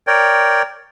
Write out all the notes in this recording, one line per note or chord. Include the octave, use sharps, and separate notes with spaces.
A#4 C#5 D5 G5